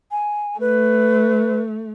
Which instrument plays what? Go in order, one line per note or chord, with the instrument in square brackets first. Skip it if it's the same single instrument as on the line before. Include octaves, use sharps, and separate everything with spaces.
[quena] G#5
[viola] A3 [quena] B4